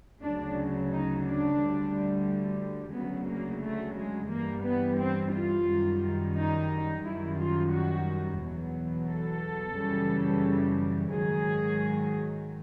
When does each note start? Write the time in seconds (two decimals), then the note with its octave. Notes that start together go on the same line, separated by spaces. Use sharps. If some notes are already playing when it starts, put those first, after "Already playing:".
0.22 D2 C#3 F#3 D4
0.91 D#4
1.25 D4
1.59 D2 D3 G3
2.95 D2 C#3 F#3 B3
3.29 A#3
3.63 A3
3.97 G#3
4.31 G2 E3 G3 A#3
4.66 B3
5.00 C4
5.33 F4
5.68 F#2 D#3 G3
6.36 D#4
7.04 F#2 D#3 G3 E4
7.38 F4
7.73 F#4
8.41 E2 B2 F#3
9.09 A4
9.76 F#2 C#3 E3 G3
11.13 G#2 D#3 F#3 G#4